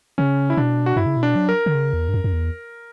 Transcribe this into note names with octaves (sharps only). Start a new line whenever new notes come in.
C#3 C#4
E4
B2 D4
F#4
G2 E4
C#3
B2
D4
F#3
A#4
D3
C#3
E2
G2
F#2
F#2
E2